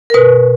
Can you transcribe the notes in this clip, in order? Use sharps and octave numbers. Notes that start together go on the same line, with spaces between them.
A#4
B2 B4